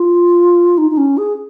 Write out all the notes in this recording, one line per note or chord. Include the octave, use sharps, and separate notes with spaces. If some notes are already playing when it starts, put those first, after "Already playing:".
Already playing: F4
D#4
D#4
C#4
G#4